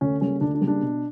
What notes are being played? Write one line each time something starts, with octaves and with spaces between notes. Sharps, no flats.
D2 C#4
C#3 G3 A#3 C#4
D2 D4
D4
C#3 G3 A#3
D4
B2